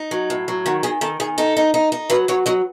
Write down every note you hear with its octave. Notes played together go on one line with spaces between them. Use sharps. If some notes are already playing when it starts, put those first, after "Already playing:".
Already playing: D#4
F#3
A2
F#3
D#3 F#4
D#3 G#4
D#3 A4
D#3 G#4
D#4 A4
D#4
D#4
D#4
F#3 B4
F#3 C#5
F#3 D#5